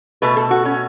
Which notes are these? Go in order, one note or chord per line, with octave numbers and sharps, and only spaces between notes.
B2 A3 B4
A4
F#4
C#4